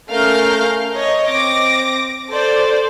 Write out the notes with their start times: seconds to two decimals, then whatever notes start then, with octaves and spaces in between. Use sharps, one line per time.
0.12 A3 C#4 A#4 F5 F6 G6
0.95 C#5 D#5
1.28 C4 D6 A#6
2.29 A4 C5 D5